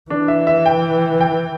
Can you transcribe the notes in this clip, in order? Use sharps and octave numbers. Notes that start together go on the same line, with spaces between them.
E3 D4
E5
E5
G5
G5